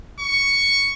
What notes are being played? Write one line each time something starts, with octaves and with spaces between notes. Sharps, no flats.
C#6